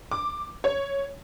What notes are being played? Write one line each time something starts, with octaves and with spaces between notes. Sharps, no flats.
D6
C#5